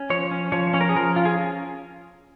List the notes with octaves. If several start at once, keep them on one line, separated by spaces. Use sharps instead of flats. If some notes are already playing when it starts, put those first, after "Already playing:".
Already playing: C#4
F3 C#5
C#4
F3 C#5
C#4 C#5
A#4
G#4
F3 A#4
C#4 F4
G#4